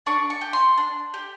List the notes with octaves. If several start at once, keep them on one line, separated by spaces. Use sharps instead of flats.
D4 C#6
C#6
G4
C6
D4
G4